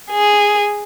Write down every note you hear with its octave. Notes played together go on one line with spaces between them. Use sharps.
G#4